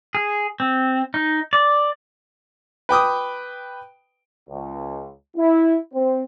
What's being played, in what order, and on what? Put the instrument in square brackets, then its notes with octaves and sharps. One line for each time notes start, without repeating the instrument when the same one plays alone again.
[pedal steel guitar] G#4
C4
D#4
D5
[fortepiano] B4 G5 D6 D#6
[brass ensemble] C#2
E4
C4